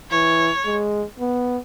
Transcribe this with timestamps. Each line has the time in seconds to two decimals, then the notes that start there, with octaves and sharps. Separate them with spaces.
0.11 E3 C#5
0.66 G#3
1.20 B3